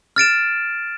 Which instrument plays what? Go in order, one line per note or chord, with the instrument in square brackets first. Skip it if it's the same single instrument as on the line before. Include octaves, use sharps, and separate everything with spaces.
[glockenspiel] F6 A6 D7 E7